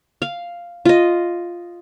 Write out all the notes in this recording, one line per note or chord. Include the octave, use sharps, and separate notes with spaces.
F5
F4 D#5